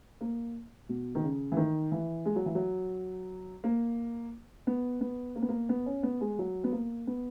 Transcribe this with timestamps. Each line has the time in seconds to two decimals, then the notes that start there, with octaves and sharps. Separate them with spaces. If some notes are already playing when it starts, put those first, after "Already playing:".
0.21 A#3
0.89 B2
1.15 D#3
1.23 C#3
1.52 E3
1.57 D#3
1.92 E3
2.26 G#3
2.36 F#3
2.46 E3
2.55 F#3
3.64 A#3
4.67 B3
5.01 B3
5.36 A#3
5.42 B3
5.49 A#3
5.69 B3
5.86 C#4
6.03 B3
6.21 G#3
6.39 F#3
6.64 B3
6.72 A#3
7.07 B3